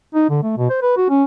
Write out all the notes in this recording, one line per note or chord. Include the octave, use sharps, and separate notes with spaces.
D#4
D3
A3
B2
C5
B4
F#4
C#4